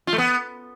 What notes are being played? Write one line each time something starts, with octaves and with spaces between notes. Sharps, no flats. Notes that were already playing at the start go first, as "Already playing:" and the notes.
F4
A3
B3